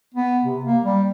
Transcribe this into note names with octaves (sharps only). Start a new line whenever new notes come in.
B3
C3
A#3
G3